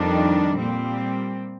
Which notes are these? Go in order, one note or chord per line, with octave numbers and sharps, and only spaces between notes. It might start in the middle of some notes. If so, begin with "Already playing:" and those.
Already playing: F2 D#3 G3 D4
A#2 G3 C4